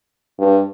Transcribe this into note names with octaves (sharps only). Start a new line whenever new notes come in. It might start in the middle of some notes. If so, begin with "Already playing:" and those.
G2